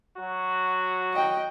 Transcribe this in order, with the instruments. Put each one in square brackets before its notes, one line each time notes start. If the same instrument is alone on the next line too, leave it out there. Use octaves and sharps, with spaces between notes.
[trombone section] F#3 F#4
[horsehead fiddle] D#5 G5